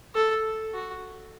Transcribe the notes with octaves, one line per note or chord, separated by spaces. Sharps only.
A4
F#4